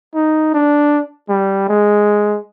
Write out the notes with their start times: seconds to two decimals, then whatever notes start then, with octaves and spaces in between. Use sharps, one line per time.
0.15 D#4
0.54 D4
1.29 G3
1.68 G#3